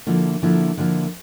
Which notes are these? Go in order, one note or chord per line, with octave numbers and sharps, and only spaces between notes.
D3 F3 A#3 E4
D3 F3 A#3 E4
D3 F3 A#3 E4